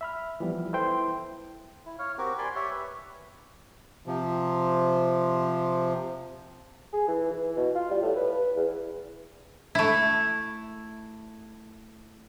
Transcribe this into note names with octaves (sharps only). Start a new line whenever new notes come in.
E5 B5 F6
E3 F3 G3 B3
E4 A4 B4 C5 G5 C6
E4
C#5 F5
C4 F#4 G4 A#4
D5 G#5 B5 C6
G4 C#5 E5
B4
C3 F3
G#4
E3
E3
B2
F4
G3
A2
B4
B4
E2
A3 E4